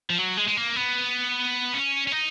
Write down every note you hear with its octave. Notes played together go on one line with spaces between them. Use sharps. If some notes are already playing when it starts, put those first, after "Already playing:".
F3
F#3
G#3
G#3
A#3
B3
C#4
C#4
D#4